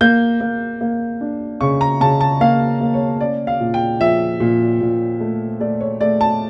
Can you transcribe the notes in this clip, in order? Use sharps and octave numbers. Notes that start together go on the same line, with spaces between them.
A#3 G6
A#3
A#3
D4
C#3 C#6
A#5
C#3 A5
A5
A#3 F5
A#3
C#5
C#4 D5
F5
A#2
G5
F3 E5
A#2
A#2
A3
A3 D5
C#5
A3 D5
A5